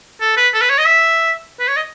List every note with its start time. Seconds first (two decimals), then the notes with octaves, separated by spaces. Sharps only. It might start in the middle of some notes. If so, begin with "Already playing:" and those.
0.21 A4
0.37 B4
0.54 A4
0.62 B4
0.70 C#5
0.78 D#5
0.86 E5
1.60 B4
1.68 C#5
1.76 D#5